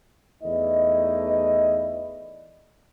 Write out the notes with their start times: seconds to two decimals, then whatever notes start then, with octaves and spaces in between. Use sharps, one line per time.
0.43 E2 A3 D#4 E4 D5 D#5